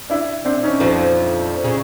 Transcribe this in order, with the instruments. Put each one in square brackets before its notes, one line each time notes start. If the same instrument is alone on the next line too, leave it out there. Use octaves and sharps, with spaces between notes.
[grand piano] D4 E4
C4 D4
C#4 D#4
[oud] F2 F3
C#3